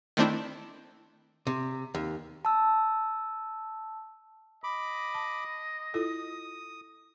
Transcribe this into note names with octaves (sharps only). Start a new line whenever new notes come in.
D#3 A3 C4 D4 E4
C3
D#2
A5 E6
D#5 B5 D6
A5
E4 F4 A4 D#6